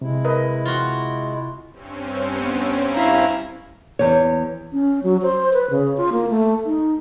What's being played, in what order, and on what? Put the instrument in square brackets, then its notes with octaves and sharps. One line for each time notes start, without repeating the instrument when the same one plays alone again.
[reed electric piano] C3 [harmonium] G#3 E4
[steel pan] A#4 B4 D#5
[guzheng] F4 F#4
[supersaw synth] G2 C4 C#4
[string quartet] B3
E4 F5 A#5
[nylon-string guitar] E2 C#5
[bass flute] C#4
F#3
C5
B4
C#3
F4
A#3
A3
D#4